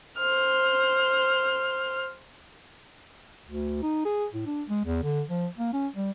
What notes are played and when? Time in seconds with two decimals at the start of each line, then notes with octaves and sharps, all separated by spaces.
0.18 C5 F6
3.47 D2
3.82 D#4
4.05 G#4
4.33 A2
4.46 D4
4.69 G#3
4.85 E2
5.03 D3
5.29 F3
5.57 A#3
5.73 C#4
5.95 G3